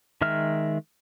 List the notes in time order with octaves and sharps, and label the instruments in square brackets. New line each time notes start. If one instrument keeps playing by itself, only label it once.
[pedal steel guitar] D#3 G#3 E5 F6